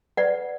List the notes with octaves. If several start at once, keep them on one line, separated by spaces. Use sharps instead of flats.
B4 D5 F#5